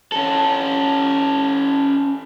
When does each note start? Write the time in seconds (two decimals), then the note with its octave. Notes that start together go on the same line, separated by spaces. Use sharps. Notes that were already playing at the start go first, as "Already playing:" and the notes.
0.12 C#4 A4